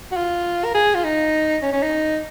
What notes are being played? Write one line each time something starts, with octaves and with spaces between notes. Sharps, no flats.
F#4
F4
A#4
G#4
F4
D#4
C#4
C#4
D#4